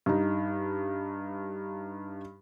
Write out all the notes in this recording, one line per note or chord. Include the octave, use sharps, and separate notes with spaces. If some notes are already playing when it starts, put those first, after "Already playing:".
G2 D#4